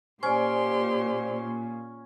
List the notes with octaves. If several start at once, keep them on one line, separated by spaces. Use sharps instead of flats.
A#2 C#4 G4 C5 D5 C6